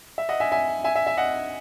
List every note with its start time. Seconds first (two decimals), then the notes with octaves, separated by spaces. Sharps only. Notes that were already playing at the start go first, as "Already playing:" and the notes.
0.18 E5
0.29 D#5 F#5
0.40 E5 G#5
0.52 E5 G#5
0.84 E5 G#5
0.95 E5
1.07 E5
1.17 D#5 F#5